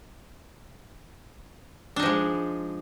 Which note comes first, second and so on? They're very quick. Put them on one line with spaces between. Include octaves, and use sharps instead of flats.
D4 D#4 F3 G#3